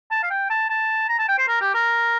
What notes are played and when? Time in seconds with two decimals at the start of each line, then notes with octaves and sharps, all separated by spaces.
0.11 A5
0.23 F5
0.30 G5
0.50 A5
0.69 A5
1.09 A#5
1.19 A5
1.28 G5
1.38 C5
1.48 A#4
1.61 G4
1.74 A#4